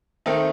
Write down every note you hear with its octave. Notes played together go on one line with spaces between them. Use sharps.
D#3 A3 C4 D#4